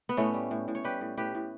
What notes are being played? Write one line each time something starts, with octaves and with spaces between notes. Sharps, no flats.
B3
A2 A3 C#4
G3
A2
A2
C#5
G3 G4 B4
A2
A2 G4 B4
A2